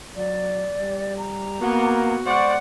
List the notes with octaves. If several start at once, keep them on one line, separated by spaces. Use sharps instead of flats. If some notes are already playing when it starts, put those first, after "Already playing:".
F#3 D5
G3
A#5
A#3 B3 F#4
G#3 C5 D5 F#5 C#6